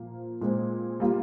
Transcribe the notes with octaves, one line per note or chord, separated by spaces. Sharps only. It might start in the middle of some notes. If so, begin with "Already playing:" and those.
Already playing: A#2 F3 A#3
A#2 G#3 C4
G3 A#3 F4